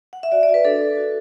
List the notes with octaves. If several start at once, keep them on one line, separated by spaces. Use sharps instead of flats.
F#5
E5
F#4 D5
D5
F#4
B4
D4 A4
D4
F#4